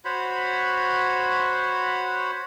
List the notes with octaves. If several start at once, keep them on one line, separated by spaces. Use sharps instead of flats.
F#4 C5 C#5 B5